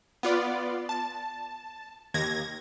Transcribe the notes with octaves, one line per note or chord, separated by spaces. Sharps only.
B3 F4 D5
A5
D#2 G#6 A#6